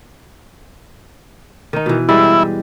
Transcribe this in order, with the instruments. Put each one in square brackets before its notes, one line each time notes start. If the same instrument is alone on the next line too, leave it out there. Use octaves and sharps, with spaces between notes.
[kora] D#3 D#4
B2 E3
[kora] G3 G#3 B4 [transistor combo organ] E4